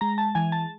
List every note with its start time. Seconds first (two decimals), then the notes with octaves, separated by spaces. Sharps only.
0.01 G#3 A#5
0.18 A5
0.35 E3 G#5
0.52 A5